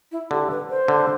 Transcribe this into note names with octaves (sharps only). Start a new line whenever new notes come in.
E4
D3 G4
B4
C5
D3